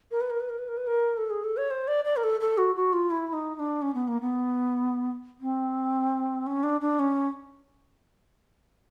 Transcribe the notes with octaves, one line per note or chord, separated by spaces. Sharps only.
A#4
B4
A#4
B4
A#4
B4
A#4
B4
A#4
A4
G#4
A4
C#5
C5
D5
D5
A#4
A4
A4
F#4
F#4
F4
E4
E4
D#4
D#4
D4
C#4
B3
A#3
B3
C4
C#4
D4
D4
C#4